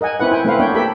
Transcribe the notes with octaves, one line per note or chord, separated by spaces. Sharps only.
A#4 D#5 F#5 G#5
C4 E4 B4 F#5
E4 G5 G#5
A3 C4 E4 B4 F5 F#5
A#3 B3 D4 C#5 G5
G4 A4 A#4 G5 B5